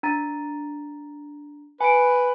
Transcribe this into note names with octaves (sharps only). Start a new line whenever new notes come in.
D4 A#5 A6
B4 G#5 D7